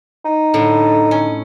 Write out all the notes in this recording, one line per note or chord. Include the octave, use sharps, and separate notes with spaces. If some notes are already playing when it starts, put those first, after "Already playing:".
D#4
A2 D3
C#4